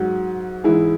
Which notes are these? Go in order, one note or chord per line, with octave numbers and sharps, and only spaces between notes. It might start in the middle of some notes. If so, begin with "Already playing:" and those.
Already playing: G#2 F#3 F#4
G#2 E3 E4 G#4